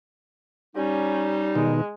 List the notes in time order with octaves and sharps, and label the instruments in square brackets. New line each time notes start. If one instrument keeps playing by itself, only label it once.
[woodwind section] G3 D#4 [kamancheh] C#4
[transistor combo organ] B2 D#3 [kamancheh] G#3